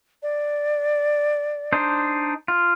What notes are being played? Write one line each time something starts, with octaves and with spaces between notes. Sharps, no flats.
D5
D4 D#4 C5
F4